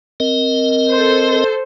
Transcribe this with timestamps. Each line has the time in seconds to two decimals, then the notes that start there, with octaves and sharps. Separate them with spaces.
0.20 C4 A#4 D#5
0.89 A4 C5